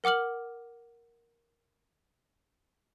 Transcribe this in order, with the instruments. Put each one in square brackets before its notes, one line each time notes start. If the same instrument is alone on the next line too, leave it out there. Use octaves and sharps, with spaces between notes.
[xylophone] A#4 F#5 D6 F6 F#7